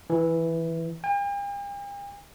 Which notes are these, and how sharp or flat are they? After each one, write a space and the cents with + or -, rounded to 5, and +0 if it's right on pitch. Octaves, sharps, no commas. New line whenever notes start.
E3 +0
G5 +45